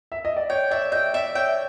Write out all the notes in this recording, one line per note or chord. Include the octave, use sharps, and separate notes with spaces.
E5
D#5
D5
C#5 G5
D5 E5
D#5 G5
D5 E5
C#5 G5